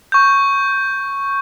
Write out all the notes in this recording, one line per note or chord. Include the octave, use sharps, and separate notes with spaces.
C#6 G6